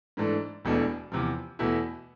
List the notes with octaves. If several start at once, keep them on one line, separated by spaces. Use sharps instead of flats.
G#2 E3 A3 D4
E1 E2 B2 A3 D4
E2 C3 F3
E2 B2 A3 E4